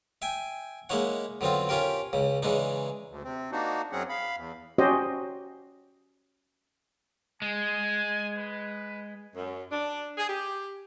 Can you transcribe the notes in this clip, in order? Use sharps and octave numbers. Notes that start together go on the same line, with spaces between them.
E5 G5 G#5
G#3 A#3 D#4 E4 C#5 F#5
D3 F#3 B3 C4 F4
C#4 F4 G4 A#4 G5
C#2 C#3
C#3 E3 G#3 D4 D#4
D2
C3 C4
A#3 D4 D#4 F#4
F#2 F#3 C4 C#4 G#4 F#5
F5 B5
E2
C#4 F#4 G4 C5 D#5
G#3 G#5
B4
F#2
D4
G#4
G4